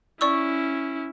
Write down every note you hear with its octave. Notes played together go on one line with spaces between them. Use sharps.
C#4 E4 D5 C#6 E6